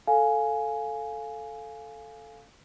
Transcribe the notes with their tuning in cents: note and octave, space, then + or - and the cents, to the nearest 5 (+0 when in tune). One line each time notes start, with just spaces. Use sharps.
A4 +0 F5 +0 G#5 +5